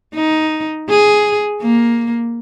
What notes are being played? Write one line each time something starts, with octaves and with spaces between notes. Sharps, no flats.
D#4
G#4
A#3